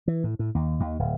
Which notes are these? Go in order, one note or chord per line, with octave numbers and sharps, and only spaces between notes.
E3
A2
A2
D#2
D#2
D1